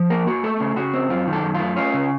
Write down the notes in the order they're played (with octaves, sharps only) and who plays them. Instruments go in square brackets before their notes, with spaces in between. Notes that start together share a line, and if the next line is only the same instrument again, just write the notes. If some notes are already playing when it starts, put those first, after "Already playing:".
Already playing: [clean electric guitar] F3
A#3 A#4
A#3 F#4
A3 A4
C#3
C#3 F#4
C4
F#2 F4
D#3
A4
F#2
F4
A3
C#4 F4
C#3